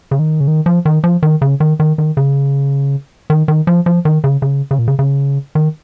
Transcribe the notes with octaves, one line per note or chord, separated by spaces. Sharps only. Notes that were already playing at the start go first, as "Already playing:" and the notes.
C#3
D#3
C#3
D#3
F3
D#3
F3
D#3
C#3
D#3
D#3
D#3
C#3
D#3
D#3
F3
F3
D#3
C#3
C#3
C#3
A#2
C#3
C#3
D#3